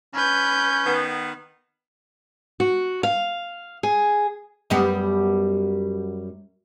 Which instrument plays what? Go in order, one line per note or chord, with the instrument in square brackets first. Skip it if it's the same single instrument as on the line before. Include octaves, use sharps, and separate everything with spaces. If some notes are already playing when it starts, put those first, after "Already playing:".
[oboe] C#4 [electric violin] B4 G6
[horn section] D#3 B3
[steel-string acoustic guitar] F#4
F5
G#4
[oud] F#2 G3 B3